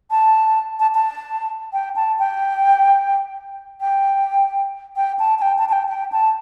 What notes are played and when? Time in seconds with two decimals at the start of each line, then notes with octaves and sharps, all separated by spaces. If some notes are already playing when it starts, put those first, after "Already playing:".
0.11 A5
0.80 A5
0.95 A5
1.73 G5
1.96 A5
2.19 G5
3.81 G5
4.96 G5
5.19 A5
5.39 A5
5.42 G5
5.58 A5
5.69 A5
5.73 G5
5.89 G5
6.12 A5